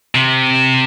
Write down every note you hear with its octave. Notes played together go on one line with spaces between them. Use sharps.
C3